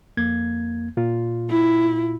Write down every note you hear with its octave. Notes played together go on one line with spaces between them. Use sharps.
F2 A#3 G#6
A#2 F4
E4